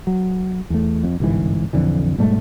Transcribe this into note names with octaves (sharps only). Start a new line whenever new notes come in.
F#3
E2 A3
F2
G1 C2 G#2 E3
B1 F2 D3 E3
G#2 B2 G3 A3